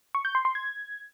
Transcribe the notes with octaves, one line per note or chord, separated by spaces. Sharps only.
C#6
G6
C6
C6
G#6